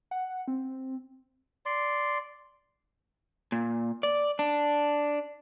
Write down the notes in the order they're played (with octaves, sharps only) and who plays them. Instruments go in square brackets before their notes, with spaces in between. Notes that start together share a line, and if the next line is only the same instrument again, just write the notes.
[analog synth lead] F#5
C4
[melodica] D5 C6
[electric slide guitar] A#2
D5
D4